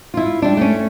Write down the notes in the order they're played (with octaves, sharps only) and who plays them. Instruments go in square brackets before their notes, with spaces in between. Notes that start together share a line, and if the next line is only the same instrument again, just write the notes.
[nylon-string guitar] E4 F4
G3 D4
A3 C#4